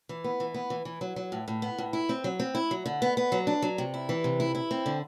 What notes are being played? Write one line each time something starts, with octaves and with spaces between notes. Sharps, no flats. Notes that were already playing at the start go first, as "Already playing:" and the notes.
E3
B3
E3
B3
E3
E3
F#3
F#3
A2
A2
B3
A2
E4
C4
F#3
C4
E4
F#3
D3
B3
B3
F#3
D4
F#3
C3
E4
E3
C3
E4
E4
C4
D3